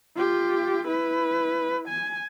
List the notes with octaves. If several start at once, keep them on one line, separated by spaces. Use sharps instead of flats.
F4 G4
E4 B4
G#5